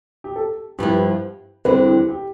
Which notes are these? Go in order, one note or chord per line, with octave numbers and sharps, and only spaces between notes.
G4
A4
G2 F3 B3 E4 G4
E2 D3 G3 C4 B4
G4
G4